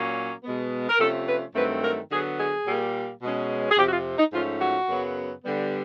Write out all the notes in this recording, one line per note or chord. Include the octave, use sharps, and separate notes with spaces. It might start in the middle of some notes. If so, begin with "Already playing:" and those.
Already playing: A#2 F#3 A#3 C#4
B2 G#3 B3
A#4
C3 F3 A3 C#4 A4
B4
G2 D#3 F#3 A3 C4 B4
A#4
D3 F#3 B3 G#4
G#4
A#2 G3 A#3
B2 G#3 C#4
G#4
F2 C3 F3 G4
F#4
F4
D#4
G#2 F3 A3 C#4 F4
F#4
F#2 C#3 F#3 B3
D3 G3 B3